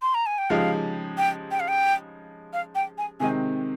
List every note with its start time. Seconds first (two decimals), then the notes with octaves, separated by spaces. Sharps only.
0.02 C6
0.14 A#5
0.26 G#5
0.38 G5
0.50 C#3 F3 G#3 D#4 G4 F5
1.18 G5
1.51 G5
1.60 F5
1.68 G5
2.53 F5
2.75 G5
2.98 G#5
3.20 C3 D#3 G#3 C4 D#4 G#5